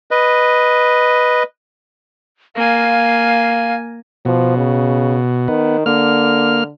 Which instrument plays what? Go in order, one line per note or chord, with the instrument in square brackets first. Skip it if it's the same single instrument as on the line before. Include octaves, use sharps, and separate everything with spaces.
[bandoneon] B4 D#5
[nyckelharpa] A#3 G#5 [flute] F5
[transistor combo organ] B2 [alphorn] F3
[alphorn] C#3
[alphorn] D#3 [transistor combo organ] B3
[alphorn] D3 [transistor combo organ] A#3 F6